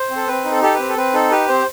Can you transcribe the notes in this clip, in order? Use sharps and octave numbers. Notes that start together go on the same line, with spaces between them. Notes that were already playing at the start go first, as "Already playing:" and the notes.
Already playing: C5
C4
A4
C4 B4
D#4
A4
G4 A4
C4 B4
A4
C4 B4
D#4 A4
G4 B4
C4 C5